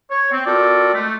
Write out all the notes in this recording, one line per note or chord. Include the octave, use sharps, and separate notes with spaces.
C#5
C4
C4 F4 F#4 A4 A#4 D5
G#3 A3